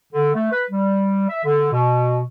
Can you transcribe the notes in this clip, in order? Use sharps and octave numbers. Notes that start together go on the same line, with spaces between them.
D3
A3
B4
G3
E5
D3
B2